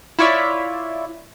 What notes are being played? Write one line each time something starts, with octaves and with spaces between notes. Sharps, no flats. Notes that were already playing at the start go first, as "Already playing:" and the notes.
E4 F4 C#5 D5 E5